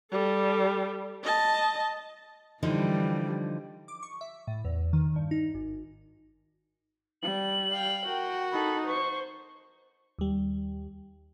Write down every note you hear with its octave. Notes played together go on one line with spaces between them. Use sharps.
G3 A4
D#5 A5
D3 E3 F3 G3 D#4
D6
C#6
E5
A2
E2
D#3
G2
D#4
G#1
G3 F#7
F5 G5
F#4 A#4 G5
D#4 A4 B5
C5 C#6
D#2 G3